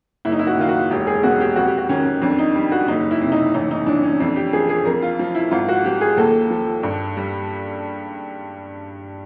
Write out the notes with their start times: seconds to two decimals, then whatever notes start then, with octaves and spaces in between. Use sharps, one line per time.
0.25 F#1 E4
0.32 D#4
0.39 E4
0.47 F#4
0.57 D#3 F4
0.68 F#4
0.90 E1 G4
1.07 G#4
1.23 B2 F#4
1.40 G4
1.56 F2 F#4
1.67 G4
1.78 F#4
1.89 D#3 C#4
2.22 F2 D4
2.39 D#4
2.55 G3
2.72 F#4
2.88 F#1 D#4
3.11 E4
3.22 C3
3.32 D#4
3.54 A1 D#4
3.71 D#4
3.87 E3 D4
4.03 C#4
4.20 F2 D4
4.36 G4
4.53 F3 G#4
4.69 G#4
4.85 F2 A#4
5.02 F4
5.19 F3
5.35 E4
5.51 G#1 F4
5.69 F#4
5.85 F3 G4
6.01 G#4
6.17 D#2 A4
6.50 F3
6.83 G2
7.17 G3